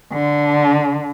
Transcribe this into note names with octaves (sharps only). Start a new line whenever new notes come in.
D3